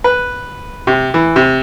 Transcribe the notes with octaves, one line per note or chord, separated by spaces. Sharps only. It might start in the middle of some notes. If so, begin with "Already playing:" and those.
B4
C3
E3
C3